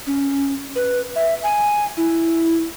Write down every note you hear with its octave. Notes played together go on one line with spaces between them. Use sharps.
C#4
B4
E5
G#5
E4